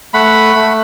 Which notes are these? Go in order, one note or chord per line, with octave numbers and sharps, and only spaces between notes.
A3 F#5 B5
A3